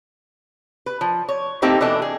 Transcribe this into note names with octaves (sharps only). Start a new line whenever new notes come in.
B4
F3
C#5
A3 A#3 C4 D#4 G4 C5
B2 E3 D4 A4 D#5
G#4